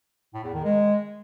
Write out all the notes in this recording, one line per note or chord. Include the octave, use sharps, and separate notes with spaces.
A2
E2
D#3
G#3